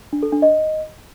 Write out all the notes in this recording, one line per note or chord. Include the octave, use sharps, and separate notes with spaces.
D4
A4
D4
D#5